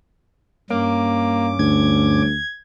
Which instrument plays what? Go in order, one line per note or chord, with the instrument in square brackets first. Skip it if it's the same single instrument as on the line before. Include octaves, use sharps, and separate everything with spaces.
[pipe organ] G2 C#4 D6 [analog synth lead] A#3
[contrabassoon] D2 [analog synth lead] G#6